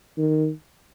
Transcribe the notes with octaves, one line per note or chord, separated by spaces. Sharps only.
D#3